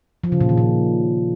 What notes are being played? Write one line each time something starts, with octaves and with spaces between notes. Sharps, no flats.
F3
C#3
A#2
D#3
A#2